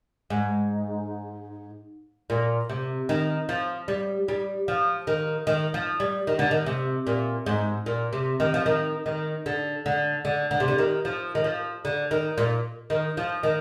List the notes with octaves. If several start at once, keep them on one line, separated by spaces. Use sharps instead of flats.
G#2
A#2
C3
D#3
F3
G3
G3
F3
D#3
D#3
F3
G3
D#3
D3
D#3
C3
A#2
G#2
A#2
C3
D#3
F3
D#3
D#3
D3
D3
D3
D3
C3
D3
D#3
F3
D#3
F3
D3
D#3
A#2
D#3
F3
D#3